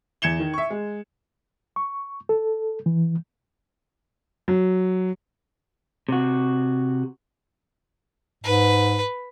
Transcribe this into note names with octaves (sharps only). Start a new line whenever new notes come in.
E2 G#6 C#7 E7 G7
D#3
E5 C#6
G#3
C#6
A4
E3
F#3
C3 F#4
G#2 B4